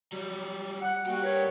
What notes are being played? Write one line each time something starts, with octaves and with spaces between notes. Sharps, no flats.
F#3 G3
F#5
G2 G3 A#3 F#4 F#5 G5
A#4 B4 C#5